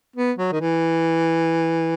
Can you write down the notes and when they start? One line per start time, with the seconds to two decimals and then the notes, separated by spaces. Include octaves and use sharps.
0.16 B3
0.38 F#3
0.52 D#3
0.61 E3